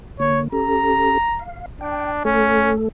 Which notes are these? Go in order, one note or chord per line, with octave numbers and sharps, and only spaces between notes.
D3 A#3 C#5
C#4 G4 A4 A#5
F5
D4 G5
A3 C#4 A4